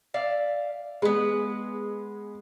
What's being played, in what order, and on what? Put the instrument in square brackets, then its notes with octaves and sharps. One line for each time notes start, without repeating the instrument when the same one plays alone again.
[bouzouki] D5 E5 F5
[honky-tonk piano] G#3 [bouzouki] B3 B4